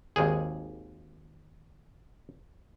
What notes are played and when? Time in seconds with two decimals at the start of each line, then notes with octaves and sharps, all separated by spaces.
0.16 G#1 D#2 G#4